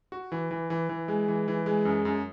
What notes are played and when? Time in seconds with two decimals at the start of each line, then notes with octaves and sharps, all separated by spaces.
0.12 F#4
0.32 E3
0.51 E3
0.70 E3
0.89 E3
1.08 G#3
1.28 E3
1.48 E3
1.66 G#3
1.85 F#2
2.05 F#2